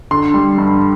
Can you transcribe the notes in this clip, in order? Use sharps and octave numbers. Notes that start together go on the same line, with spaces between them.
D3 C6
G3
G2